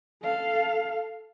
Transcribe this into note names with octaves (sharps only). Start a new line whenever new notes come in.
A4 F5